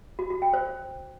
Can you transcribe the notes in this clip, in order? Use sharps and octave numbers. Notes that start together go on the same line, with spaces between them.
F#4
F#4
G5
C5